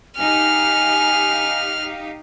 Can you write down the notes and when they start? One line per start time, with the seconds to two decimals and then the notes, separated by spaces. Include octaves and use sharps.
0.17 D#4 G4 F5 G#5 F6